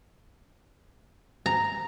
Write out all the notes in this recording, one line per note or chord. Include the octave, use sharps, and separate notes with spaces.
A#5